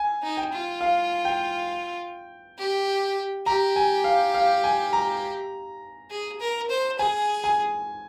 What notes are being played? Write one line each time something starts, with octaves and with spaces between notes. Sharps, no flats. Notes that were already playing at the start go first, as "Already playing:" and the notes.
Already playing: G#5
D#4
G5
F4
F5
G5
G4
G4 A#5
G#5
F5
F5
G#5
A#5
G#4
A#4
C5
G#4 G#5
G#5